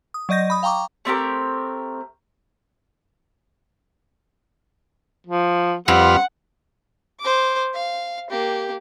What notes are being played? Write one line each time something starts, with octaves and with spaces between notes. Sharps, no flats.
D#6
F#3 D5 D#5 G6 A#6
B5 D#6
F5 G5 A#5 C#6 D6
A3 C4 G4 A#4
F3
F2 G3 C4 B4 F5 F#5
C5 D6
F5
A#3 G4